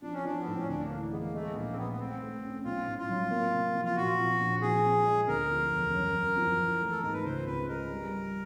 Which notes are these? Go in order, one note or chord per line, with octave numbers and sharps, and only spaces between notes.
F3 D4
C#4
F3 D4
B3
A2 C4
C#4
D2 D4
A#3
E3
G#3 B3
A#3
G#3 A3
B3
A#1 A#3
C4
G#3 B3
B3
A3 C4
A3
C#4
B1 F4
A2
F4
F#3
A#3
C3
F3
F4
A#2 F#4
F3
A#1
F3 G#4
C4
G#3
D2 A#4
F3
E1
F#2
F#2
F3
E3
A3
A4
G#2 A#4
B4
C#2 C5
C#2 B4
G#3 A#4
G3
G3